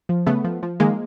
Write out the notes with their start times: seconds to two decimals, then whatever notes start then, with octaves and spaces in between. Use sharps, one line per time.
0.09 F3
0.26 C#3 A3 B3
0.44 F3
0.63 F3
0.80 D#3 G#3 A#3